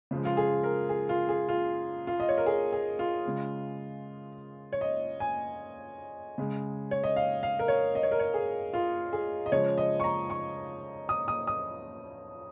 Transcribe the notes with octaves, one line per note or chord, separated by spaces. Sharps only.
C#3 F3 G#3
F4
G#4
A#4
G#4
F4
G#4
F4
F4
D#5
C#5
A#4
G#4
G#4
F4
C#3 G#3
C#5
D#5
G#5
C#3 G#3
C#5
D#5
F5
F5
A#4
C#5
D#5
C#5
A#4
C#5
G#4
F4
G#4
D#5
C#3 F3 G#3 C#5
D#5
C#6
A#5
C#6
D#6
D#6
D#6